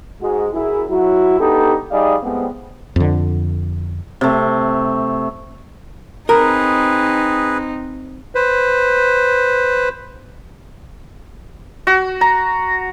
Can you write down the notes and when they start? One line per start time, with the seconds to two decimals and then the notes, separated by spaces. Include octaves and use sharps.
0.22 G#2 G#3 F#4
0.53 F#2 E4 G#4
0.90 F#3 E4 F#4
1.40 B3 D4 D#4 G4 A4
1.91 G3 D#4 G#4 D5 D#5 F5
2.23 A2 G3 G#3 B3 C4
2.96 F2 D3
4.21 C3 A3
6.29 C4 D#4 G#4 A#4 B4
8.35 B4 C5
11.87 F#4
12.21 A#5